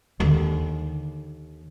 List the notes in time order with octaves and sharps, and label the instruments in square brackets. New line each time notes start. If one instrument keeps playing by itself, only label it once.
[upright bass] D#2 D3